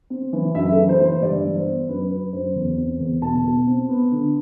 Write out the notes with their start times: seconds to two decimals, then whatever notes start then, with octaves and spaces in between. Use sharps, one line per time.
0.10 C4
0.33 E3
0.55 F#2 E5
0.72 A4
0.77 E3
0.89 C5
1.00 E3
1.05 C5
1.21 G2 D5
1.45 E3
1.56 C5
1.66 B3
1.89 F#2 B4
2.10 F#2 B4
2.33 F#2 C5
2.55 E2
2.77 C4
3.00 E2
3.22 B2 A5
3.44 B2
3.67 C4
3.89 B3
4.11 D3